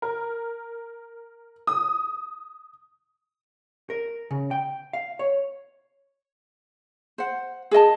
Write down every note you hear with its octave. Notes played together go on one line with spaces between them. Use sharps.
A#4
D#6
A#4
C#3
G5
F5
C#5
C5 F#5
G#4 A#4 D#5 A5